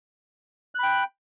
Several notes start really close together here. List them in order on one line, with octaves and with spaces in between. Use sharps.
F#6 B5 G5